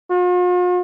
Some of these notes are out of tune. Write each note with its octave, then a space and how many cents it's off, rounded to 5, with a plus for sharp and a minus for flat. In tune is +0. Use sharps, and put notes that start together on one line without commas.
F4 +45